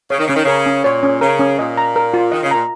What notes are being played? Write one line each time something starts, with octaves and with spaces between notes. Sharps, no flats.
C#3 C#5
D#3
C#3 C#4
D#3
C#3 A#4
C#4
A#2 C#5
C#4
C#3 A#4
C#4
A#2 D#5
A#5
A#4
F4
D#3 D#5
C#3
A#2 A#5